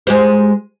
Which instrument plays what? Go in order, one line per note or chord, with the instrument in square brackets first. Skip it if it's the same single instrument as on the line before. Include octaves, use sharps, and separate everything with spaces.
[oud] G#3 G4 C5